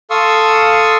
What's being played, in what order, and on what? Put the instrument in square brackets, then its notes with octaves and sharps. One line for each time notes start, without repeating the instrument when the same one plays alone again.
[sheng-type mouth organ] A4 F5 C6 C#6 D#6 E6